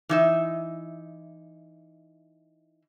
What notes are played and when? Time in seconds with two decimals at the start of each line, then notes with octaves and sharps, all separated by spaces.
0.09 E3 D#4 E5